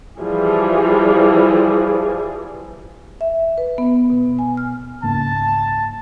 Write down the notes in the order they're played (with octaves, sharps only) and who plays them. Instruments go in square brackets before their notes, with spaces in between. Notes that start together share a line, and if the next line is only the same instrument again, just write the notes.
[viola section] E3 F3 G3 G#4
[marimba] E5
B4
B3
B2
G#5
F6
[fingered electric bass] C#2 G#2 A#3 [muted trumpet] A5